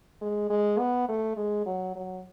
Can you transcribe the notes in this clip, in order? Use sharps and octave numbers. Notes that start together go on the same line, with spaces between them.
G#3
G#3
B3
A3
G#3
F#3
F#3